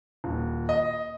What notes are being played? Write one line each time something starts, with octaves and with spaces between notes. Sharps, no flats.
D#1
D#5